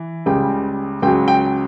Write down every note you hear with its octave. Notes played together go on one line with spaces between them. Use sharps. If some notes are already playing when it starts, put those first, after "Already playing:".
Already playing: E3
C#2 C#3 G3 G5
C#2 C#3 F#3 G5
G5